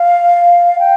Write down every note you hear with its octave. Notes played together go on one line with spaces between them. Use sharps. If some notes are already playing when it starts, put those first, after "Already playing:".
Already playing: F5
G5